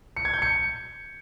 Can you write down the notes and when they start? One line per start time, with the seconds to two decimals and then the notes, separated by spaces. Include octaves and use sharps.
0.17 C#7
0.25 G#6
0.34 G6
0.42 C#7